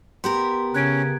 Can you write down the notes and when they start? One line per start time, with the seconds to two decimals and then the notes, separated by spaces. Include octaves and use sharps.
0.24 B3 G4 A#4 C6
0.74 C#3 C#4 F#6 G#6 D7